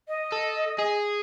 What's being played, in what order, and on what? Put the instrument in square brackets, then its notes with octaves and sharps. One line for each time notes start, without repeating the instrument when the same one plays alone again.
[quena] D#5
[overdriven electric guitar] A4
G#4